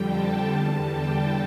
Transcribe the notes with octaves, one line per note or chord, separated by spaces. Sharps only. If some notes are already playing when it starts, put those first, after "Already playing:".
Already playing: F2 D3 G3 G5
A5
E2 D3 G3
G5